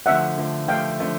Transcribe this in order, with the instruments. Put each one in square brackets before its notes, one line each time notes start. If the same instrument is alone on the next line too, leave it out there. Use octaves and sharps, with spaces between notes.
[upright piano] D3 F3 A3 [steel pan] E5 F#5
[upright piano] D3 F3 A3
[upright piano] D3 F3 A3 [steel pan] F5 G5
[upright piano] D3 F3 A3